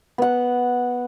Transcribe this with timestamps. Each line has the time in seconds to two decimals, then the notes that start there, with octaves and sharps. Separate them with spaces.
0.18 B3 F#5